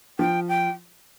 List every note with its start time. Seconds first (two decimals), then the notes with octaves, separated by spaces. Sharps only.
0.19 F3 G5
0.49 G5